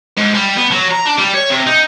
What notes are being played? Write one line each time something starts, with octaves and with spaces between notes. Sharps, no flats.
G#2
G3
B3
F#3
A#5
D4
G3
C#5
C3
D#4